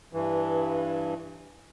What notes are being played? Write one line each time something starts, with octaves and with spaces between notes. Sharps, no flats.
G2 E3